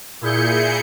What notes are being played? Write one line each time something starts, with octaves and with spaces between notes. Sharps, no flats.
A#2 E4 G#4 G6 C#7